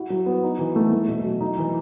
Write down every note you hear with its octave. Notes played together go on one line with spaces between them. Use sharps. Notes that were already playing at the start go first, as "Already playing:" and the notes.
Already playing: E4 F#4
F#3
B3
D#4
E3
A3
A3
B2
F#3
D#4
E3